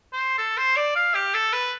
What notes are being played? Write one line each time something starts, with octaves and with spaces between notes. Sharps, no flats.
C5
A4
C5
D5
F5
G4
A4
B4